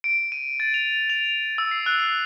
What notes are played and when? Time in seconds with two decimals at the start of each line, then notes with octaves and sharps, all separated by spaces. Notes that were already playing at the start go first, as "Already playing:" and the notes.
0.04 D7
0.32 D#7
0.60 A6
0.74 F7
1.10 F7
1.58 E6
1.71 C7
1.86 F#6
2.00 C7